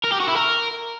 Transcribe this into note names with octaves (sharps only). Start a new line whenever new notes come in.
A#4
G4
F#4
E4
A#4